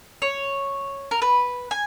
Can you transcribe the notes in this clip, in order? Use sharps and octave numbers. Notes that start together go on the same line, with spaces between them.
C#5
A#4
B4
G#5